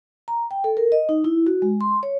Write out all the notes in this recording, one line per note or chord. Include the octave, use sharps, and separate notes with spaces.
A#5
G5
A4
A#4
D#5
D#4
E4
F#4
G#3
C6
C#5